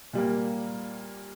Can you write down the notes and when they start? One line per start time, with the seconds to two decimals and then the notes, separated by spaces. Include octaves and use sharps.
0.13 A#2 G3 A#3